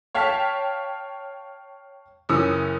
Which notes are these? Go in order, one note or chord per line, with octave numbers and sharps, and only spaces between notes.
C#5 F5 G5 A5 F6 B6
F#1 E3 C#4 D#6 E6 C#7